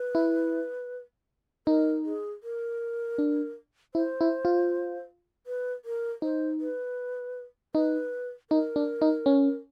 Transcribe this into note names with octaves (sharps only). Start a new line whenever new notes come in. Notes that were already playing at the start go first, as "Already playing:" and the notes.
Already playing: B4
E4
D#4 A#4
G#4
A#4
D4
E4 C5
E4
F4
B4
A#4
D#4 C5
B4
D#4 B4
D#4 A#4
D4
D#4
C#4